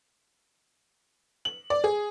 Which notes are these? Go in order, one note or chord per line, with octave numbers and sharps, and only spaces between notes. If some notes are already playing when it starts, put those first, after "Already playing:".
F#7
D5
G#4